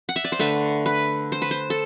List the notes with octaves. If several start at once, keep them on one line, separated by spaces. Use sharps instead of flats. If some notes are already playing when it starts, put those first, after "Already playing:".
F#5
E5
D5
C5
D3 A3 B4
B4
C5
B4
C5
A4